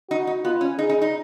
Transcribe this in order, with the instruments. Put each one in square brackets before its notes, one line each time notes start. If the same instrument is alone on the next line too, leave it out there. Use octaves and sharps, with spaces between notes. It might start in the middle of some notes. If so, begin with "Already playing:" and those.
[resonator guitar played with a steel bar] D#4 [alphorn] F#4
[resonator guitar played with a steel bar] D#4
[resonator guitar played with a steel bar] B3 [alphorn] F4
[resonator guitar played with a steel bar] C#4
[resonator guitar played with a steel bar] D#4 [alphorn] G#4
[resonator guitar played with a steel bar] D#4
D#4